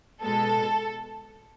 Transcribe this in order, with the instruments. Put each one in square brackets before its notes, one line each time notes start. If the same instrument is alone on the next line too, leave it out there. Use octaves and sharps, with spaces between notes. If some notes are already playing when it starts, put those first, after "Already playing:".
[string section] B2 G#3 A4